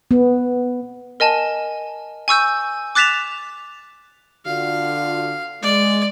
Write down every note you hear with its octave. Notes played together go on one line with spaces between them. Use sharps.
B3
A#4 D#5 G#5 A5
G#5 C#6 E6 G6
D6 F#6 A6 B6 E7 F7
D3 F4 F#4 F5
G#3 D5